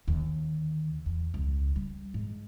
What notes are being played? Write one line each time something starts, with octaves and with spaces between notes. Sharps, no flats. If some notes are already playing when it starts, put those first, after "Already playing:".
D#2 D3
E2
C#2
G3
G#2